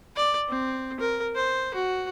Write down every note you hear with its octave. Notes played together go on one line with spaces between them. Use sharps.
D5
C4
A#4
C5
F#4